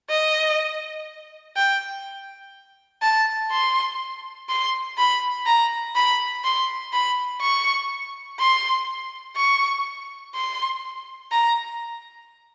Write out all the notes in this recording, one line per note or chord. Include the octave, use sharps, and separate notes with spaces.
D#5
G5
A5
C6
C6
B5
A#5
B5
C6
B5
C#6
C6
C#6
C6
A#5